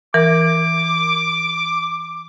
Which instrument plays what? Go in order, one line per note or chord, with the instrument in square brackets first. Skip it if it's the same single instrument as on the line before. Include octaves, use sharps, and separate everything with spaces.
[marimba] E3 A#4 [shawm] D6